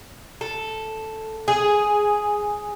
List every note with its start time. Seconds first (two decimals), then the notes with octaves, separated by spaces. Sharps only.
0.41 A4
1.48 G#4